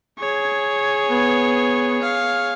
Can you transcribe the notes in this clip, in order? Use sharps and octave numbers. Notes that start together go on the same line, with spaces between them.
G#4 C#5
B3
F5